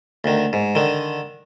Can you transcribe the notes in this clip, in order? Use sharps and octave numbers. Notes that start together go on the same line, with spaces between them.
D2 D#3
G#2
D3 D#3